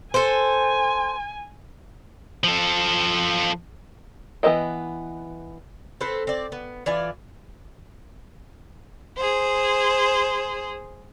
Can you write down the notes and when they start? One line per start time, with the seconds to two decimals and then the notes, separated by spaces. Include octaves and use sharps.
0.14 A4 C5 G#5
2.44 F3 A4
4.43 E3 B3 A4 D#5 G5
6.01 C4 A4 B4 C5
6.27 C4 D5
6.52 B3
6.86 E3 F4 D5 G#5
9.17 G#4 C5